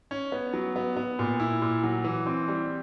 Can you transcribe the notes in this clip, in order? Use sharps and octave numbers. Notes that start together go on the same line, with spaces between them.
C#4
B3
F#3
B3
B3
A#2
E4
A#2
F#3
E3
C4
G3